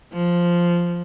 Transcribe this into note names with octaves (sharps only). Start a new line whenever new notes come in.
F3